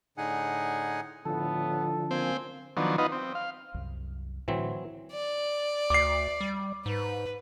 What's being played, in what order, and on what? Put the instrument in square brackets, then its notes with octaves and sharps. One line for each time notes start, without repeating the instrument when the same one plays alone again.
[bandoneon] A2 D3 D#4 G#4 F#5 G#5
[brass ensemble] A2 B3 [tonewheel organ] D3 F3 [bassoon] A4
[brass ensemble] A#3 F5 G#5 [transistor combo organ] C4
[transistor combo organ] D#3 F3 F#3 B3 D4
B3 D#4 F4 B4 D#5 F#5
C4
F5
[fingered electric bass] C2 F#2
[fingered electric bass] A2 D3 [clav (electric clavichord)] E3 F#3 C4
[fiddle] D5
[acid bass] D2 [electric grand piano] D6 C7
[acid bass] G3
[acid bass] G#2 [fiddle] B4